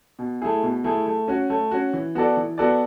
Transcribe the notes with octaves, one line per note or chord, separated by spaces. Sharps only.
B2
A3 E4 G#4
B2
A3 E4 G#4
A3
C#4 F#4
A3
C#4 F#4
E3
B3 F#4 A4 D5
E3
B3 F#4 A4 D5